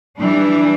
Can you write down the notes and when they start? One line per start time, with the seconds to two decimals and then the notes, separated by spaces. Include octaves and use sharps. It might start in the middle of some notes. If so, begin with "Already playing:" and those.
0.19 E3 G3 D4